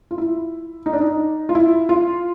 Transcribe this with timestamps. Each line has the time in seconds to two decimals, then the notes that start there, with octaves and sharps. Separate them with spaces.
0.11 F4
0.18 E4
0.86 D#4
0.93 D4
1.01 D#4
1.49 F4
1.55 E4
1.89 F4